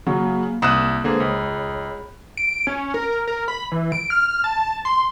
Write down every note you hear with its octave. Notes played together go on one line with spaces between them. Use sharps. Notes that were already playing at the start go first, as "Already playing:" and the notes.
C#3 F#3 A#3
C2 D#6 F#6 E7
D3 G#3 A#3 G#4 B4 C5
C#2 G#4 C#5 B5
D7
C#4
A#4
A#4
B5
E3
D7
F6
A5
C6